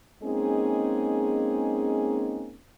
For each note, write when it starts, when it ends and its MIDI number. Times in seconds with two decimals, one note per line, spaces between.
0.23 2.54 56
0.23 2.54 58
0.23 2.54 60
0.23 2.54 61
0.23 2.54 63
0.23 2.54 68